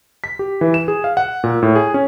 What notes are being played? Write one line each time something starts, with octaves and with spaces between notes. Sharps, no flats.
B6
G4
E3
E7
G#4
F5
F#5
A#2
A2
G#4
C#4